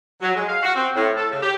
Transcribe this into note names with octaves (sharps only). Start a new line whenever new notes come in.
F#3
G#3
F5
F#4
C4
A2
A4
C#3
G4